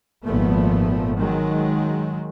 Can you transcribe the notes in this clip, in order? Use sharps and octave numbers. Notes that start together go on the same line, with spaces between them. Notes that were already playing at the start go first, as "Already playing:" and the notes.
G#1 A#2 F3 A3 B3
D#3 F#3 G#3